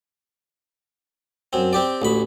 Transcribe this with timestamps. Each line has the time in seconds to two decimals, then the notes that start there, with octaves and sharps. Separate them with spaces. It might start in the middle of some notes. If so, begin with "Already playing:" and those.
1.53 F#2 C4
1.73 C4 G4 D5
2.02 A1 D2 B5